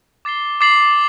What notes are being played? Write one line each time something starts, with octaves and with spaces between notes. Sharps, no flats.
D6 A6 C7 G7
D6 A6 C7 F#7